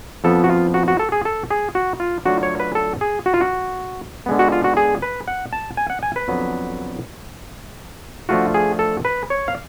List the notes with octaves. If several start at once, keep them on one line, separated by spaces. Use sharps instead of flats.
F2 F3 B3 A4
F#4
F4
F#4
F#4
A4
G#4
A4
G#4
F#4
F4
D3 F#3 A3 F4 F#4
C#5
B4
A4
G#4
F#4
F4
F#4
D3 G#3 B3
F#4
F4
F#4
G#4
B4
F#5
A5
G#5
F#5
G#5
B4
F2 D3 F#3 B3
D3 F3 A3 F4 F#4
G#4
A4
B4
C#5
F5